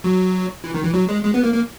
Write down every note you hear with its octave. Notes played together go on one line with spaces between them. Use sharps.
F#3
E3
D#3
E3
F#3
G#3
G#3
B3
A#3
A#3